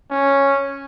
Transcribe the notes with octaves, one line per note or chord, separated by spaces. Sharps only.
C#4